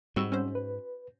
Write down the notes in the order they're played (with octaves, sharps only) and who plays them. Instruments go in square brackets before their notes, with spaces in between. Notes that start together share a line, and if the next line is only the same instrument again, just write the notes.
[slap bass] G#2 [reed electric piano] G3 C4 E6 [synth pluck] F#4
[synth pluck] C#4 F#4 C5
[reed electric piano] B4